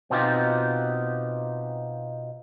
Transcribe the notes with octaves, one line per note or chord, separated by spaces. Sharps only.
B2 B3 C4 D#4 F4 G4